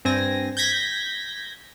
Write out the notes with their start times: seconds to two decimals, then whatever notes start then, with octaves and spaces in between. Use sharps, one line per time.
0.05 G2 C4 G#5 A#6
0.57 G6 G#6 A#6 B6